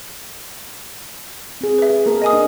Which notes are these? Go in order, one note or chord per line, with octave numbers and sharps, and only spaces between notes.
C4 G#4
B4 E5
G#4
A#3 A4 A#4
D#5 G#5 D#6
D4